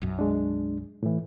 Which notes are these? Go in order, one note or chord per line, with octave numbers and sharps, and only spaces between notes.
B1 F#2
G#3 D4
A2 E3